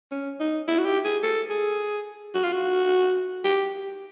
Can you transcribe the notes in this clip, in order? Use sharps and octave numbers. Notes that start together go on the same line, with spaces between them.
C#4
D#4
E4
F#4
G4
G#4
A4
G#4
F#4
F4
F#4
G4